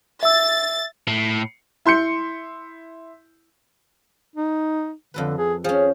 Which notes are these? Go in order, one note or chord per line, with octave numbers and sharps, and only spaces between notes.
E5 E6 A6
A2
E4 C6 G6 C#7
D#4
F2 D3 A4 B4
G#4
F3 C#4 G#4